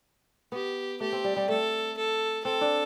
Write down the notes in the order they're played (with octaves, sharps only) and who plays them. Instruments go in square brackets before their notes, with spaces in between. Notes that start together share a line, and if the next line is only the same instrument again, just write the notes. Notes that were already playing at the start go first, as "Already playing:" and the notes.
[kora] B3 [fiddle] G4
[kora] A3 [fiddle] G4
[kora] C4
G3
G3
[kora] A3 [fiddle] A4
[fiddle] A4
[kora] C4 [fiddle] A4
[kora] D4